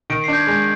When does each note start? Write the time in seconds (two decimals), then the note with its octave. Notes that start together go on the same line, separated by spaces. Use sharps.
0.10 D#3 D7
0.24 C7
0.28 D4 G6
0.38 G#6
0.47 G#3 G6